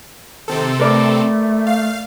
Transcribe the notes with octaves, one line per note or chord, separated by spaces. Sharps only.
C3 D#3 C4 A4
A3 A#4 B4 D5
F5